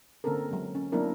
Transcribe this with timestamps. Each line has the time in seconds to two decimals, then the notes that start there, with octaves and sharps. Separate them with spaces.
0.24 D3 A#3 C4 C#4 A4 A#4
0.51 F#3 G#3
0.75 C#4
0.92 F#3 A#3 B3 D4 E4 A#4